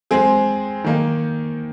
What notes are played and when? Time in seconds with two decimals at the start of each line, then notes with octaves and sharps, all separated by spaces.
0.11 G#3 C4 G#4
0.84 D#3 A#3 D#4